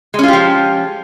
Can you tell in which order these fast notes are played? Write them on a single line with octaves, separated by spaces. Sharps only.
G#3 C#4 F4 G4 F3